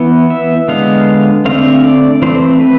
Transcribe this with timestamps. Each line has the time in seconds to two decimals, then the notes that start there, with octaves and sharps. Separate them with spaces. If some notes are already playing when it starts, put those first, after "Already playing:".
Already playing: E3 B3
0.30 E5
0.68 D3 G#3 B3 F5
1.45 D3 A3 C4 F5
1.84 D5
2.22 E3 A3 C4 C5
2.60 B4